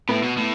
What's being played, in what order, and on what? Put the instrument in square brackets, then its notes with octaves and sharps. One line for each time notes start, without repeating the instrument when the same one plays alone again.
[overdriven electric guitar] A2 [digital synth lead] B3
[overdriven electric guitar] B2
A2